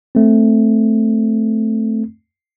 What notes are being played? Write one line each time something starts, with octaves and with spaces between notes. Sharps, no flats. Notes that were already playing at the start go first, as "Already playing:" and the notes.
A3 C4